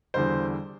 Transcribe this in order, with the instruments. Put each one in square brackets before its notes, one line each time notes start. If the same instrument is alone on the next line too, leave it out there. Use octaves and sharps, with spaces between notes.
[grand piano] E2 D3 G3 C5